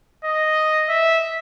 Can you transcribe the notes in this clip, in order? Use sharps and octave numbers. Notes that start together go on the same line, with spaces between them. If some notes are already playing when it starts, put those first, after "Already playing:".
D#5
E5